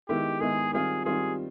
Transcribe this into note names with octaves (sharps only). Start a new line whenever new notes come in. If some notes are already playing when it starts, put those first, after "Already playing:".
D#3 G#3 B3 E4 G4
D#3 G#3 B3 E4 G#4
D#3 G3 C4 F4 G#4
D#3 G3 C4 F4 G#4